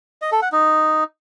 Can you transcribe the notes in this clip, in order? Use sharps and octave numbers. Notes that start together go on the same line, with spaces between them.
D#5
A4
F#5
D#4